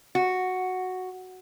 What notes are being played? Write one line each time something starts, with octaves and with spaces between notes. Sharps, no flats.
F#4